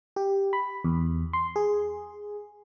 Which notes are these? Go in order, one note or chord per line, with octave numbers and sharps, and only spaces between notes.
G4
B5
E2
C6
G#4